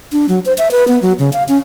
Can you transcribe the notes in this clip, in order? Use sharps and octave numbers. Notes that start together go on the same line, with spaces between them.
D4
F#3
C5
E5
B4
B3
F#3
C#3
F5
C#4